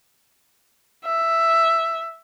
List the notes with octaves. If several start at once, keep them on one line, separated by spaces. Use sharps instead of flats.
E5